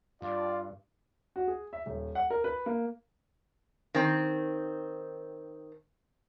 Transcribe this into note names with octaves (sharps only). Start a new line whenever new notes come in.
G2 F4 D5
F#4
G#4
E5
D#1
F#5
A#4
B4
A#3
D#3 C4